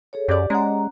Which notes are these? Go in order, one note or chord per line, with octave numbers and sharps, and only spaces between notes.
G#4 A4 C#5
F#2 G4 D5
G#3 C#4 F#5 A#5